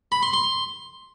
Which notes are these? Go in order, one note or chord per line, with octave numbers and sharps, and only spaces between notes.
B5
C6
C6